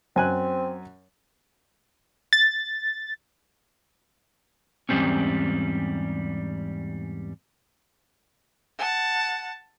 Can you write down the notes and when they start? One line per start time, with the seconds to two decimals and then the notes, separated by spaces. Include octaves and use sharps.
0.16 F#2 C4 G#5 F#6
2.33 A6
4.89 E2 G#2 E3 G3 C4 C#4
8.78 F#5 A5